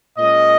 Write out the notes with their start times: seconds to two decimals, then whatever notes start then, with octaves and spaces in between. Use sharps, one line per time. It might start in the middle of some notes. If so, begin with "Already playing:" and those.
0.18 A#2 G#3 C#4 D#5